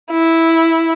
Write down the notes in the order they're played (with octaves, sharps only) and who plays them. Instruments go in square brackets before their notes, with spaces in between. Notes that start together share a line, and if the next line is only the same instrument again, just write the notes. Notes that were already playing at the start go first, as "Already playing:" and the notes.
[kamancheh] E4